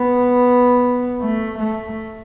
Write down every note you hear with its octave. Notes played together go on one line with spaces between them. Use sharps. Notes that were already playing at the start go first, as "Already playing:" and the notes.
Already playing: B3
A3
A3